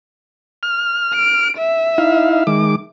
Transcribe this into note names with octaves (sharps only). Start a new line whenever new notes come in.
F6
D7
E5
D#4 E4 F5
D#3 G#3 D6